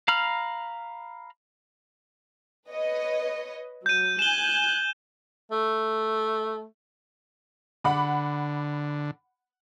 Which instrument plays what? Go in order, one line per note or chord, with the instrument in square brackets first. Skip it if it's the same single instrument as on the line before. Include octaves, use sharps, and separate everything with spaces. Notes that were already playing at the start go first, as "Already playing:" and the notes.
[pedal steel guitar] F5 A#5 B5 F6
[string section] B4 C#5 D#5
[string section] F#3 [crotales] G6 D#7
[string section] G#5 F#6 G6 [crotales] E7 G7
[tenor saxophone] A3
[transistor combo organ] D3 [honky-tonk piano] F#5 B5 D6